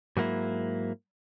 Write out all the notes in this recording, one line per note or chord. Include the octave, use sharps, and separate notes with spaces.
G#2 F#3 A#3 E4